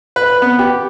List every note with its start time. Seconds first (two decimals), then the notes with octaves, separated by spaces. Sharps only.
0.16 B4
0.42 B3
0.59 G4